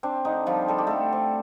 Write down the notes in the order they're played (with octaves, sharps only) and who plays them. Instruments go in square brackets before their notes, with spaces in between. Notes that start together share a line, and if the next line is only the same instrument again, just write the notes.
[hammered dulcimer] C4 D4
D3 D#4
F3 G3 F4
G3 A4
G4
D3 A3 A4
C4